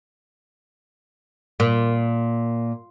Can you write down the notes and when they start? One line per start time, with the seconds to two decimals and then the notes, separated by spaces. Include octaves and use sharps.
1.60 A#2